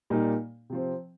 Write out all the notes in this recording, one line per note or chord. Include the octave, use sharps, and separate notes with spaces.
A#2 G3 A#3 D#4
C3 F3 C4